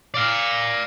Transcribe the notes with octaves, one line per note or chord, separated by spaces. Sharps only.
D5 F5